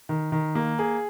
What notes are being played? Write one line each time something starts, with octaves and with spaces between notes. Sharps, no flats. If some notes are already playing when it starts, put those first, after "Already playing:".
D#3
D#3
A#3
G#4